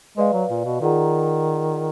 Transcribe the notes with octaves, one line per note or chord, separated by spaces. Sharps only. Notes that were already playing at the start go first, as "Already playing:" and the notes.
G#3 B4 D5 F5
F#3
A#2
B2
D#3 F4 G#4 D5 F#5 A#5